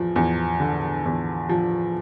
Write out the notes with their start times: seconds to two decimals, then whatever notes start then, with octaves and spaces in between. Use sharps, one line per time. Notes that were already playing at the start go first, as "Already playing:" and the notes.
Already playing: E2 F3
0.16 E2
0.60 D3
1.05 E2
1.49 F3